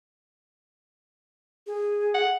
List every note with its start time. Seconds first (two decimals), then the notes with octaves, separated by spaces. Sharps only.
1.67 G#4
2.14 F#5